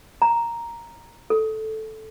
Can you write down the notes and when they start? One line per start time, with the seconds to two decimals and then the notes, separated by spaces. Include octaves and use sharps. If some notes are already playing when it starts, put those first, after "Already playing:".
0.22 A#5
1.30 A4